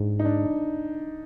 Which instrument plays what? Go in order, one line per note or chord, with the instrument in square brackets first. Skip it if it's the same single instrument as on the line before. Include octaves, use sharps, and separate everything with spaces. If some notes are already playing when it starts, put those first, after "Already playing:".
Already playing: [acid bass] G#2 [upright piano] D4
[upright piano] D#4
D4